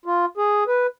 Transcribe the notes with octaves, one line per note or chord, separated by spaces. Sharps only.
F4
G#4
B4